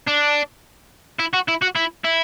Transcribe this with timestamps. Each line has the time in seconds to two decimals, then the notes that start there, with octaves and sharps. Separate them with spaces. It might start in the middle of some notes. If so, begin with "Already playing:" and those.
0.08 D4
1.20 E4
1.34 F#4
1.49 E4
1.62 F#4
1.76 E4
2.05 E4